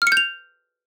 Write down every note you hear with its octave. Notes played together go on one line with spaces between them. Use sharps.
F6
C#7
G6
F7